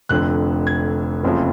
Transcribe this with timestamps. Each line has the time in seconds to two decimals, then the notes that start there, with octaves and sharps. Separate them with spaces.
0.09 F1 F2 D3 F#6
0.67 G#6
1.23 F#1 F2 C#3 F3